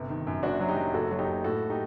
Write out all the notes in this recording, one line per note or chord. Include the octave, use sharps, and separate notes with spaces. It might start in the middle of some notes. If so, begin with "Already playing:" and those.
Already playing: G1 C3
D#3
F#2
F#1 D4 F#4
F#3
D#4 G4
F#3
F#1 F#4 A4
F#3
D#4 G4
F#1
A2 F#4 A4
D#4 G4